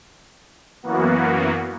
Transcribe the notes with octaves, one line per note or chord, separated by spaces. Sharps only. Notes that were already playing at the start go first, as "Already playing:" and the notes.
F#2 E3 A#3 B3 F#4